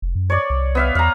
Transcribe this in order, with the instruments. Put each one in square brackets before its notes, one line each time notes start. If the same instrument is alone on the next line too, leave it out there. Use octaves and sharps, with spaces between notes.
[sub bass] F1
F#2
[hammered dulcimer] C#5 D5
[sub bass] C2
[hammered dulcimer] B3 E5 F5
[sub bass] E2 [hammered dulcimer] F5 A#5